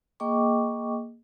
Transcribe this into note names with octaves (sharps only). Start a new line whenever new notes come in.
A#3 G#4 D#5 G5 C#6 D6